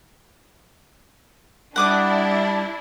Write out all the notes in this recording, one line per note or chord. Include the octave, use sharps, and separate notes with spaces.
G3 D4 E4 F#5 D6 D#6